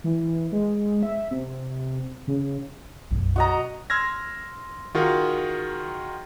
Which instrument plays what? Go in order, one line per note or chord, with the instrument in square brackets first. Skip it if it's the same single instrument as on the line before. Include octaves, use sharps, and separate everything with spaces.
[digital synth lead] E3
G#3
E5
C3
C#3
[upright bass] B1 F#2
[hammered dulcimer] F#4 D#5 A#5
[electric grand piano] C6 E6 F6 G#6 A#6
D#3 F4 F#4 G#4 A#4